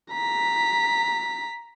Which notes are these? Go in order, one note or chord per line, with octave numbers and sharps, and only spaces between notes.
A#5 B6